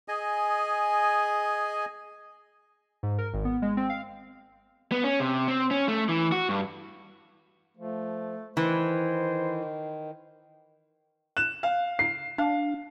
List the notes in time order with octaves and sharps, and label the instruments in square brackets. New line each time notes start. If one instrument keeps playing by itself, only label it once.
[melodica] G#4 D#5 G#5
[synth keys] G#2
A#4
G#1
B3
G#3
C4
F5
[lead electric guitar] B3
C#4
C3
C4
C#4
A3
E3
F#4
G2
[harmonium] F3 [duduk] A3
[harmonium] D#3 [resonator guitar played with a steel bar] E3 [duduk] C5
[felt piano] F#6 [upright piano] E7
[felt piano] F5
[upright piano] C7
[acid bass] D4 [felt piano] F5